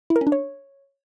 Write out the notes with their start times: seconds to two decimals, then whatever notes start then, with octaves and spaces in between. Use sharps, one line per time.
0.10 E4
0.16 A#4
0.21 C#4
0.27 D4
0.32 C#5